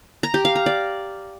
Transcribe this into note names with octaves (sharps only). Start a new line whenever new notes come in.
A#5
G4
F5
A#5
D5